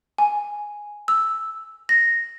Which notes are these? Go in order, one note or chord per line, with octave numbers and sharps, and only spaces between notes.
G#5
E6
A#6